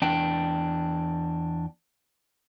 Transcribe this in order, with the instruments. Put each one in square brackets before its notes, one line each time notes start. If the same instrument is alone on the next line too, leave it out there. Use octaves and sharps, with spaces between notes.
[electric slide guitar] E2 D4 G5